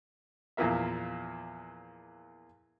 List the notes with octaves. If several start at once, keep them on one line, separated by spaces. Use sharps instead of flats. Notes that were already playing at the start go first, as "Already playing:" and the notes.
E2 A#2 F3 A#3 E5